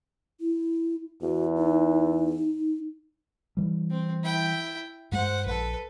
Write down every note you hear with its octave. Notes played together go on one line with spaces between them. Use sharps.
E4
E2 F#4
D#4
E3 G3
C4
E4 G5
G2 G#3 C5 F#5
A#1 A4 B4